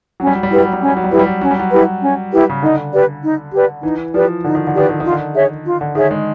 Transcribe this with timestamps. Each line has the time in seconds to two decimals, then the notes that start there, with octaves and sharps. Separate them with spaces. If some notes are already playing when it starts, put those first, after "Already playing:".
0.20 F#3 C#4
0.27 G3
0.36 F#3
0.43 G3
0.50 F#3 E4 G4 B4
0.58 G3
0.65 F#3
0.73 G3
0.81 F#3 C#4
0.88 G3
0.97 F#3
1.04 G3
1.10 F#3 E4 G4 B4
1.19 G3
1.27 F#3
1.41 F#3 C#4
1.51 G3
1.60 F#3
1.71 E4 G4 B4
2.01 C#4
2.33 E4 G4 B4
2.50 C#3
2.62 D3 D#4
2.92 G4 B4 D5
3.23 D#4
3.53 G4 B4 D5
3.83 E3 D#4
4.14 F3 G4 B4 D5
4.44 D3 D#4
4.55 D#3
4.67 D3
4.74 D#3 G4 B4 D5
4.89 D3
5.00 D#3 F4
5.11 D3
5.34 G#4 C#5 E5
5.65 F4
5.81 D3
5.95 D#3 G#4 C#5 E5
6.11 G#3